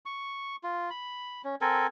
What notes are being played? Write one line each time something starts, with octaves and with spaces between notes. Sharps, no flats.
C#6
F4
B5
C#4
C4 A4 A#4 G#5